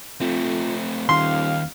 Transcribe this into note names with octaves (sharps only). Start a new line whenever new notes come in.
F2 A3 C4
D#1 D#2 F5 C6